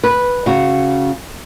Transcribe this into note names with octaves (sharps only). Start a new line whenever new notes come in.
B4
C#3 F#4